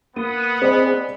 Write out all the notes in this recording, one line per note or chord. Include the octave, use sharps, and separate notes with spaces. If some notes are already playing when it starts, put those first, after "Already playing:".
A#3 B3 D#6
C4 G#4 C5 D5 D#5